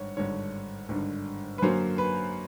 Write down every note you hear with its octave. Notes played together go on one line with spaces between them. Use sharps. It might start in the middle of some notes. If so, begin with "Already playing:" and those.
Already playing: G#1 G2 C#5
G#1 G2 D3 C#5
G#1 G2 D3
B4
F#2 D3 F#3 A#3 C5
B4